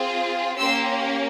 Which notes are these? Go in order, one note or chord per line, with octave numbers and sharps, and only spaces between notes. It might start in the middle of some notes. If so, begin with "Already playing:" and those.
Already playing: C4 F4 G#4
A#3 C#4 G4 C6 E6